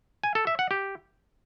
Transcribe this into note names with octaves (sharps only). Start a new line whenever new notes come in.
G#5
A4
E5
F#5
G4